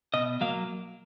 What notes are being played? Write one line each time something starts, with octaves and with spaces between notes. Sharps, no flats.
B2 D#5
F#3 A#3 F5